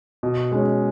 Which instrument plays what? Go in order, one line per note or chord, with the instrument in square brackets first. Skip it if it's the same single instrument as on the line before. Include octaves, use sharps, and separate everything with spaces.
[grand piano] B2
G#3 C#4